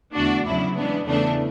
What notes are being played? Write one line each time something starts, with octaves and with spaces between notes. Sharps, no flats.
E2 D3 A3 D4 F#4
E2 C#3 F#3 E4
C#3 E3 G#3 B3 D4
E2 C#3 E3 A3 D4